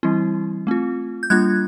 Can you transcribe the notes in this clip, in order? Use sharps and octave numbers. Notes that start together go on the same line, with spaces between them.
E3 G3 C4 E4
A3 C4 F4
G6
G3 A#3 D4 F4 F#6 G#6